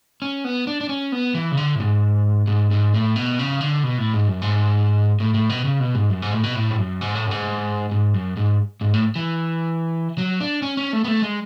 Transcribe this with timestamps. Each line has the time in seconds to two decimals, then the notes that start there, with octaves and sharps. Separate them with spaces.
0.22 C#4
0.45 B3
0.67 D4
0.81 D4
0.89 C#4
1.12 B3
1.35 E3
1.52 C#3
1.57 D3
1.75 A2
1.80 G#2
2.47 G#2
2.71 G#2
2.94 A2
3.16 B2
3.39 C#3
3.61 D3
3.84 B2
3.98 A2
4.13 G#2
4.28 F#2
4.42 G#2
5.20 A2
5.34 A2
5.49 B2
5.65 C#3
5.80 B2
5.95 G#2
6.10 F#2
6.22 G#2
6.33 A2
6.43 B2
6.55 A2
6.71 G#2
6.79 F#2
7.01 G#2
7.15 A2
7.26 F#2
7.31 G#2
7.92 G#2
8.14 F#2
8.37 G#2
8.81 G#2
8.94 A2
9.16 E3
10.18 F#3
10.40 D4
10.62 C#4
10.77 C#4
10.93 A3
11.04 B3
11.08 A3
11.23 G#3